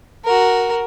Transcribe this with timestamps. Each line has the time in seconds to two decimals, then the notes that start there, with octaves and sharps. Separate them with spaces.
0.25 F#4 A#4